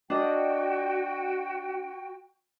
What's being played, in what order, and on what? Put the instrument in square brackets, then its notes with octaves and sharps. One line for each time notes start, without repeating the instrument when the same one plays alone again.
[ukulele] D4 D#5 [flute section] F#4 G5